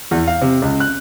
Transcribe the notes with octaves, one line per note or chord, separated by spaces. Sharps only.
E2
F5
C3
C#2
F#6